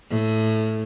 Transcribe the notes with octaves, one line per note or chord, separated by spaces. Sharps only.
A2